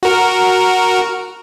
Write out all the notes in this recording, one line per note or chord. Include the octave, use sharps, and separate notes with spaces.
F#4 A#4